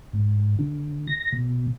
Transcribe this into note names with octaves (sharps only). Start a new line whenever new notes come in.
G#2
D3
A#6
B2